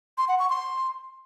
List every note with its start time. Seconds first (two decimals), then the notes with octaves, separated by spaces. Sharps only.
0.18 C6
0.28 F#5
0.39 C#6
0.50 C6